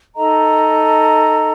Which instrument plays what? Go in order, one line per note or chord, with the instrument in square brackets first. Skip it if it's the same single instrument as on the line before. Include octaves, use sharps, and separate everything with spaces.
[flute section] D#4 A4 D#5 A#5